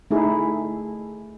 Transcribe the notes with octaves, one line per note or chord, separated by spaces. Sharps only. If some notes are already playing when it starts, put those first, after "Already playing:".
A3 D#4 E4 G#4